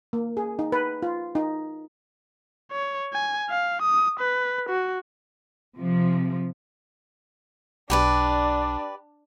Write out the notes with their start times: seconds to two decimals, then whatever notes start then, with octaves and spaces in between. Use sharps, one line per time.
0.13 A#3
0.37 G#4
0.59 D#4
0.72 B4
1.03 F4
1.35 D#4
2.72 C#5
3.13 G#5
3.50 F5
3.82 D#6
4.20 B4
4.69 F#4
5.77 C3 F3
7.90 B1 D4 G4 B4 D5